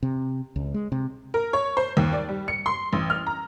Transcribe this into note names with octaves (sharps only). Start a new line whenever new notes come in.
C3
C#2
G#3
C3
A#4
C#5
C5
D#2
D5
G3
C#7
C6
A1
F6
A#5